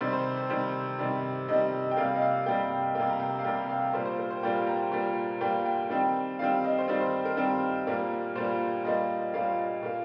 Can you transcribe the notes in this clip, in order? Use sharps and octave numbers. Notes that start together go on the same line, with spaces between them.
C3 D#3 G3 C5
C5
C5
C3 D#3 G3 C5
C3 D#3 G3
C3 D#3 G3 D#5
G5
C3 G3 A#3 F5
D#5
F5
C3 G3 A#3 G5
C3 G3 A#3 G5
A#5
G5
F5
C3 G3 A#3 G5
F5
A#2 G3 A#3 C5
C5
A#4
C5
A#2 G3 A#3 G5
A#5
A#2 G3 A#3
A#2 G3 A#3 G5
G5
D#3 G3 C4
D#3 G3 C4 F5
D#5
C5
D#3 G3 C4 D#5
C5
A#4
D#3 G3 C4
A#2 G3 A#3 A#4
A#2 G3 A#3 C5
A#2 G3 A#3 D#5
A#2 G3 A#3 F5
A#2 A#3